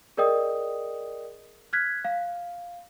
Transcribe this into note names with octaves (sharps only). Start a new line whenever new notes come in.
G#4 A#4 D5 D#5 G5 D#6
F6 F#6 G#6 B6
F5